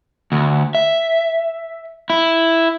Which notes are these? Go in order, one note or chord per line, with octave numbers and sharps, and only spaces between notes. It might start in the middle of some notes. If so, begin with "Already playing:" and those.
D2
E5
E4